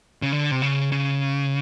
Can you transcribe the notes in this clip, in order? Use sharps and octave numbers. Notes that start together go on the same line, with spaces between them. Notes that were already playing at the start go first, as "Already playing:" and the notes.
C#3
D3
C3
C#3
C#3